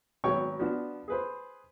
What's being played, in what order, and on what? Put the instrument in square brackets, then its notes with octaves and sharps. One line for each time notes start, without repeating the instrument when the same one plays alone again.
[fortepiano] G#1 F#3 B3 C#5 G5 C#6
F3 B3 D4 F#4
G#4 B4 C5